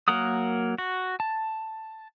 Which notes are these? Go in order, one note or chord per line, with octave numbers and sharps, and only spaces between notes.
F#3 A#3 A#4 F#5 D#6
F#4
A5